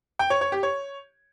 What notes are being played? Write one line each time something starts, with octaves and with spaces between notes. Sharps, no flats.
G5
C#5
C#5
G4
C#5